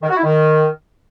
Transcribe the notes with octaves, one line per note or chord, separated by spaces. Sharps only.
D#3
F#4
E4
D#3